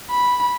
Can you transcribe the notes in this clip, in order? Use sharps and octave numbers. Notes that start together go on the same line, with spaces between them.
B5